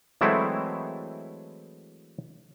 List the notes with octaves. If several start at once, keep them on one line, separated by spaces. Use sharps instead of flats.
E3 F#3 G#3 A3 C4 E4